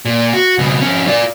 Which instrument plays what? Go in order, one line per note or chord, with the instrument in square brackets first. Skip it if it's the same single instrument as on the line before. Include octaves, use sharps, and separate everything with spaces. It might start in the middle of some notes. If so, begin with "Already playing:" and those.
[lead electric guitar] A#2
F#4
C#2 B2
F2 C#4
F4 D5